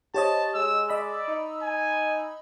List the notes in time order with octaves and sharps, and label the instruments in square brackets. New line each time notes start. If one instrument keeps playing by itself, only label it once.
[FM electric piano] G4 C#5 D#5 [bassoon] C5 [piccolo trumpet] A5
[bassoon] G#3 [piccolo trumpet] E6
[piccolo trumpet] D5 [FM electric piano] D#5 B5 E6
[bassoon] D#4
[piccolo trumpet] G#5